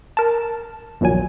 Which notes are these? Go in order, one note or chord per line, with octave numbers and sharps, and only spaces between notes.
A#4 A5
A#1 D#2 A#2 F#3 G#5